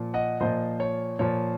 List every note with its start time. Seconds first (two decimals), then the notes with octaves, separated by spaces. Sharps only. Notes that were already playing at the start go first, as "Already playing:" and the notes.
Already playing: A#2 F3
0.14 D#5 F#5
0.40 A#2 F3 C5 D#5
0.80 C#5
1.19 A#2 F3 C#5